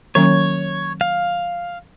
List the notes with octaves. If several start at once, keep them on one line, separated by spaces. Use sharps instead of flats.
D#3 F#3 A#3 C#4 C#5
F5